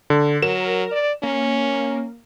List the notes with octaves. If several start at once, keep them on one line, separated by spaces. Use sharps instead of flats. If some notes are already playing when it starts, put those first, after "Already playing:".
D3
F#3 A#4 E7
D5
A#3 C#4